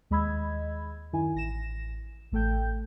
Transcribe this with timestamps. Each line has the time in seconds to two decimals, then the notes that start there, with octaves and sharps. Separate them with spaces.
0.10 D#2 G#3 D#5 B5 E6 G#6
1.13 F#2 D#3 E4 G#5
1.35 A1 A#6 E7
2.32 A1 A3 A4 G5 G6